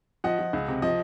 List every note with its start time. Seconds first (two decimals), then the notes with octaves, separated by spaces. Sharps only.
0.24 F3 D#5 F#5
0.39 F3
0.53 C#2
0.68 C3
0.82 F3 D#5